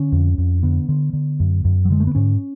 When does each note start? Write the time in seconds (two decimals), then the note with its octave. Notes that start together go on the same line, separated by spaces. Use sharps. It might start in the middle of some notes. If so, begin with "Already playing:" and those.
Already playing: D3 C#4
0.12 F2
0.38 F2
0.63 D3 B3
0.89 D3
1.13 D3
1.40 F#2
1.65 F#2
1.85 F#3
1.90 D3 G#3
2.00 A3
2.07 B3
2.15 G#2 C#4